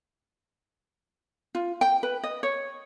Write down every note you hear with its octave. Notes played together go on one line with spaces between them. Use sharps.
F4
G5
B4
D#5
C#5